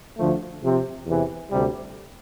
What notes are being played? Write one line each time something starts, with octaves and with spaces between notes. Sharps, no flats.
D2 D3 F3 A3
C3 F3 C4 G4 C5
E2 C3 E3
D2 C3 G3